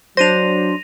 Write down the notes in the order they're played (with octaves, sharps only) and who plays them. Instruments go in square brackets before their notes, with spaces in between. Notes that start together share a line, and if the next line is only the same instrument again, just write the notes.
[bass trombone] F#3 [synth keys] D4 C5 [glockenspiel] A#6 D#7 F7